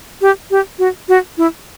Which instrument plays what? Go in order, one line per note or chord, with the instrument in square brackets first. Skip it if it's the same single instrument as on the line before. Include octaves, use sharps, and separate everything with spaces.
[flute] G4
G4
F#4
F#4
E4